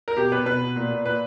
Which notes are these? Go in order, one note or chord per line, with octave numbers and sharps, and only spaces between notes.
A#4
B2 G4
B2 B4
B2 B4
B2
A#2
A#2
A#2 B4